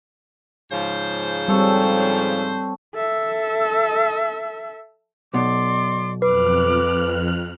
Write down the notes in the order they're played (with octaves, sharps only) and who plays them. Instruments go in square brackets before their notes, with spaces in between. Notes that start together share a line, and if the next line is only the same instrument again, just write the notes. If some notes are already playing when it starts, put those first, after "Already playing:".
[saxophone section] G#2 C#3 F3 [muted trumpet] C5
[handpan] G3 [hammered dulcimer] C4 A4 C#5
[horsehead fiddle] A4 E5
[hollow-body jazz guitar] B1 B2 [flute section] D5 C6 D6
[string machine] F2 F6 F#6 [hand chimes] B4 [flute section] D6